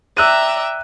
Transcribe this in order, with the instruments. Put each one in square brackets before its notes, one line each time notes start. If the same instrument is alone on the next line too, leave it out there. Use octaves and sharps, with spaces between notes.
[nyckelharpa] D5 A#5 [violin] E5 G5 [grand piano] E6 F#6 D#7